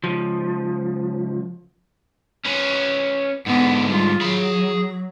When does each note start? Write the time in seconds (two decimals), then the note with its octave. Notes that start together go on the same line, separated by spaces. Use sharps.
0.04 C#2 F3
2.45 C#4 B4
3.46 G#2 D3 B3
3.88 G3 F4
4.21 F#3 G#4 B5